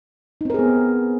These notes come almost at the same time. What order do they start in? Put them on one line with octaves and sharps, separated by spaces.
D#4 C4 A#4 G#4 B3